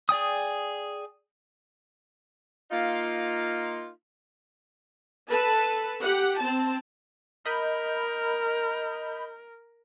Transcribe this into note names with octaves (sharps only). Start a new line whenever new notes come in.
G#4 D5 G5 D#6
A#3 D#4 F4
A4 B4 A5
G4 F#5
C4 A5
A#4 D#5 B5 G6